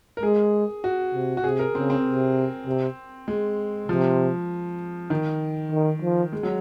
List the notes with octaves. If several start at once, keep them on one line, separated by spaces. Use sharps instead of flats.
A#4
G#3 G#4
F#4
C3
F#4
C3 G#4
A#4
C#3 C4
C4
C3
C3
G#3
C3 F3
D#3
D#3
F3
G#3
F#3